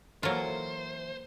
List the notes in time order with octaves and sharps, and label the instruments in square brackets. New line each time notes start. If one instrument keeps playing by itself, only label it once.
[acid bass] E3 [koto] F#3 F4 [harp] A#3 A4 [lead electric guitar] C5